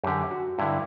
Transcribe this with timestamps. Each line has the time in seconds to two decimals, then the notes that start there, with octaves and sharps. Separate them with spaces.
0.04 F#2 D3 G4
0.31 F#4
0.58 G2 D3 E4